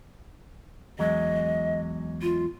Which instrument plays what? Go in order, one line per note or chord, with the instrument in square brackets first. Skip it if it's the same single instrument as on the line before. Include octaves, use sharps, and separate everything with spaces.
[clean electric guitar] E2 F#3 G#3 [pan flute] D#5
[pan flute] F4